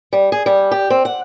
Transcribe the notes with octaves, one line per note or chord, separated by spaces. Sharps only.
G3
G#4
G3
G4
C4
F#5